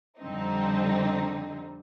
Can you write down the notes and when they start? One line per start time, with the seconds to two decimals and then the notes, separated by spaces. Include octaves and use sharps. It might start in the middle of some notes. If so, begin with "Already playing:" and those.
0.19 F2 D3 G3 C4 D#4